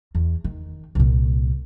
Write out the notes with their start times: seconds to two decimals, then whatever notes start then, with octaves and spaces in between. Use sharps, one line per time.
0.15 E2
0.44 D#3
0.95 C2 A#2